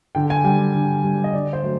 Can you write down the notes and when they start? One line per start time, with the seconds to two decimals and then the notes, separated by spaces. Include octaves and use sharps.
0.15 D3 G5
0.30 G#5
0.44 G3 G5
0.75 D3
1.04 G3
1.24 D#5
1.33 D3 D5
1.53 C5
1.63 F#3 A3